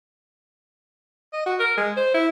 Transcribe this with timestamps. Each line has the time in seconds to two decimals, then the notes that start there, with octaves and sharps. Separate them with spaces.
1.33 D#5
1.46 F#4
1.60 A#4
1.77 G#3
1.97 C5
2.14 E4